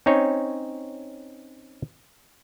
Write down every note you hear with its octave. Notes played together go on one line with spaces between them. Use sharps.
C4 C#4 D#4 C#5